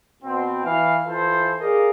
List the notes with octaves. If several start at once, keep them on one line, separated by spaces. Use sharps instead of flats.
B2 C4
E3 F5
E3 F4 A4 C5
G#4 A#4 D5 D#5 F5